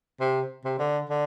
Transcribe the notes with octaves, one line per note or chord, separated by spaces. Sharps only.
C3
C3
D3
D3